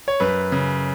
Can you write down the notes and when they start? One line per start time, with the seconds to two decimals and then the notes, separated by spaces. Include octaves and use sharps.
0.08 C#5
0.20 F#2 B4
0.52 C#3